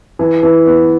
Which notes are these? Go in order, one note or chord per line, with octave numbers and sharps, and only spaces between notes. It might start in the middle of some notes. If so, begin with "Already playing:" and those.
E3
E3
B3